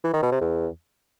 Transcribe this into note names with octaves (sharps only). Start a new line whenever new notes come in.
E3
D#3
B2
C3
E2